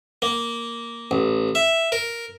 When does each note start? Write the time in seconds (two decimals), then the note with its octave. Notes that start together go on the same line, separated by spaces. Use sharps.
0.22 A#3
1.11 A1
1.55 E5
1.92 A#4